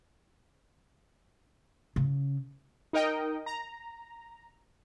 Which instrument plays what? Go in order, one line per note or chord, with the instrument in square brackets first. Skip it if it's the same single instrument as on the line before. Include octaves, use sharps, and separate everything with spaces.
[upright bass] C#3
[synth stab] D#4 A#4 D#5 G5
A#5